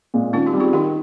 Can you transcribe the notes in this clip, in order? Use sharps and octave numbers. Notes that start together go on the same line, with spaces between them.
A#2 G#3
D#3 C#4 F4
D#4 G4
G3 C4
F4 G#4
D#3 D#4 G4